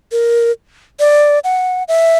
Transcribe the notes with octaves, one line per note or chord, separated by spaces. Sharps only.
A#4
D5
F#5
E5